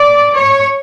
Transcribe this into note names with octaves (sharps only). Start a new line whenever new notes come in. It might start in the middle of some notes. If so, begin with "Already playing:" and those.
Already playing: D5
C#5